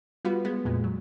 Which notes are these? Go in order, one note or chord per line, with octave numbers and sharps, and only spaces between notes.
G3 B3 F4 F#4 B4
G#3 B3
F2 A#2 G#3
F#3